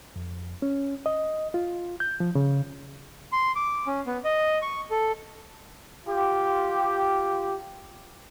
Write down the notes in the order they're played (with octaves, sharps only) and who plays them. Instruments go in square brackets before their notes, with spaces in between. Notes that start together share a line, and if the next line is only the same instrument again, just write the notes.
[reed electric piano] F2
C#4
D#5
F4
G6
F3
C#3
[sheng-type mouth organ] C6
D6
C#4
B3
D#5
C#6
A4
[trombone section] F4 G4